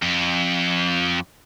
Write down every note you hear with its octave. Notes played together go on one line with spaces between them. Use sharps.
F2